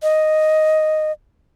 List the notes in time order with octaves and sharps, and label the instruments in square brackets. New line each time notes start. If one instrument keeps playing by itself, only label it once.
[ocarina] D#5